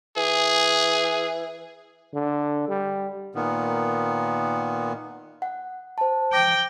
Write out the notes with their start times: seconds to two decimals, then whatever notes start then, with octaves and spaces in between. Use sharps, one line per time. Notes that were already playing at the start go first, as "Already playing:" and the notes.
0.16 E3 G#4
2.14 D3
2.68 G3
3.35 A#2 D#3 B3
5.42 F#5
5.98 C5 A5
6.33 G5 D6 A#6